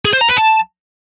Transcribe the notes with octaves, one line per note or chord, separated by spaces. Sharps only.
G#4
C5
A#5
B4
A5